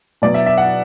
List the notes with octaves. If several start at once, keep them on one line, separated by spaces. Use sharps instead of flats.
B2 F#3 D5
E5
E5
F#5